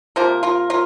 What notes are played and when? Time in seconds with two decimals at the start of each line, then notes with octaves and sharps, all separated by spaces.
0.16 C3 F3 A#3 F4 A#4
0.43 F4 A#4
0.70 F4 A#4